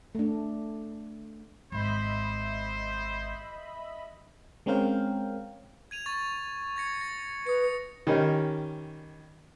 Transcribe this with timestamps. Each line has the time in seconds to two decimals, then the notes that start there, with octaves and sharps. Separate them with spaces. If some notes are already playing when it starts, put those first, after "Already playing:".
0.15 A3 D4
1.72 G#1 C5 D#5 E5 B5
4.66 G#3 C4 C#4 A#4 F5 G5
5.91 G#6 D#7 F7
6.06 C#6 A6
6.76 G#6 A#6 C#7
7.01 A#6
7.47 B4 D#6 C#7
8.07 D#3 G3 C#4 D#4